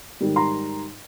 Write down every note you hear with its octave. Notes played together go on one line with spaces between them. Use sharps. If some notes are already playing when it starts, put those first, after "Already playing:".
G#2 D#3 G3
A#5 C6